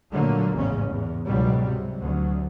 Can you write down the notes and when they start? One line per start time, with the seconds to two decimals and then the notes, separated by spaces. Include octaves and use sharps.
0.11 A#2 D3 F#3 A3 A#3
0.53 A1 E2 G#2 C#3 C#4
0.88 E2
1.25 C#2 G#2 B2 F#3 G3
1.67 C3
2.00 D2 F#3